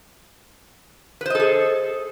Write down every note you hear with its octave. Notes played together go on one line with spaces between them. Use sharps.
G#4 A4 B4 C5 D#5